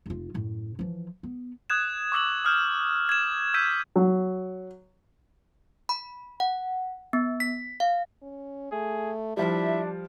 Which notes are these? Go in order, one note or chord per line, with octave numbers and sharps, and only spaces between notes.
F1 F4
F#2 A2
E3 F3
B3
D#6 F#6 G#6 E7
C#6 D6 E6 G#6 F#7
D#6 F6 G6 E7
G#6 E7
E6 G6 B6 D#7 E7
F#3
B5
F#5
B3
B6
F5
C#4
A3 G#4
F3 G3 D4 E4 E5